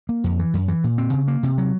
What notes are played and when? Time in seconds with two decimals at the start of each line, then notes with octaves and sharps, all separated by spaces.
0.09 A#3
0.24 F2
0.39 E3
0.54 F#2
0.68 E3
0.84 A#2
0.98 C4
1.13 C#3
1.28 A#3
1.43 C3
1.58 F#3